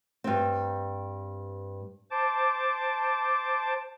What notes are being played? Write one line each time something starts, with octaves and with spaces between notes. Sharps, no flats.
G2 C4
C5 A5 D6